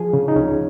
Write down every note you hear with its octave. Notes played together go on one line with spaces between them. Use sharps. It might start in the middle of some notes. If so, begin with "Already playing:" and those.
Already playing: F3 G#4
C#3
D#4
C#2 C#4